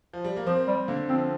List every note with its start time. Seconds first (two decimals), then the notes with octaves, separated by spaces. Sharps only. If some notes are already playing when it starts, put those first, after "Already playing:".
0.13 F3
0.24 G3
0.36 A#3
0.47 F3 C4
0.68 G3
0.88 D3 A#3
1.09 F3 C4